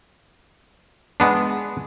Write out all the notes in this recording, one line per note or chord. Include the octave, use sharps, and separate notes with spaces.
G#3 B3 D4